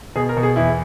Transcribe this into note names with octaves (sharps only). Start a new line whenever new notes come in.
B2 G#4
A#4
B2
G#4
E2 E4